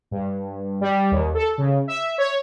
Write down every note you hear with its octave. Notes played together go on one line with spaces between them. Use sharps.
G2
G3
D#2
A4
C#3
E5
C#5